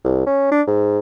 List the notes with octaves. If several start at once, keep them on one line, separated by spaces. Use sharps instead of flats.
C2
C#4
D4
G#2